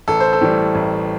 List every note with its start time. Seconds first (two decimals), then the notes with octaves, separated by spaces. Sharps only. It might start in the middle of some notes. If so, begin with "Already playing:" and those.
0.08 A1 A4
0.20 C5
0.33 A4
0.41 A2 E3 G3
0.75 A1